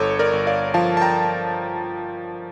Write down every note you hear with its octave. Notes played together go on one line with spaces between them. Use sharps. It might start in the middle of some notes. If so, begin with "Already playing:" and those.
Already playing: G1 A4 C#5
A#4 D5
G1
D5 F5
F3 F5 A5
A5
G5 A#5